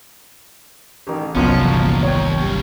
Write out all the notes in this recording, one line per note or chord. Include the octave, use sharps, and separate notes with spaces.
A1 D#3
G1 C2 B2 F3 F#3 C#4
E2 A#2
D#2 C#5 G5
F#2 G3